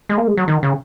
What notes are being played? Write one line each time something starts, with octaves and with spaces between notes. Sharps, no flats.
G#3
A#3
G#3
F#3
D#3
C#3